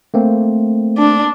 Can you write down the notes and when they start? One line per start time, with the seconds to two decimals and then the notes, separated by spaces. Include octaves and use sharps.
0.14 A3 A#3 C4
0.98 D4